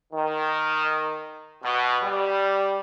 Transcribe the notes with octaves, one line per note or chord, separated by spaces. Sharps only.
D#3
B2
G3